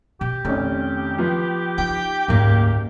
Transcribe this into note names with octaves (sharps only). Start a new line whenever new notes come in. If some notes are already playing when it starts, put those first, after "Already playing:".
B2 G4
F1 D#3 C#4
F3 B3
D#4 G5
F#1 D2 G#2 A#3